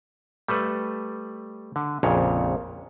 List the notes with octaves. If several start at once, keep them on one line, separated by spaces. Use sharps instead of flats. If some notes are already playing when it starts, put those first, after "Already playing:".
G3 A3 A4 B4
D3
A#1 F2 A#2 C#3 C#5